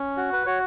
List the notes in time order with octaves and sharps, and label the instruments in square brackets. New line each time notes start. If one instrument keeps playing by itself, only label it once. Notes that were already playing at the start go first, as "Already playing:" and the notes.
Already playing: [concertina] C#4
F#4
B4
F#4 C#5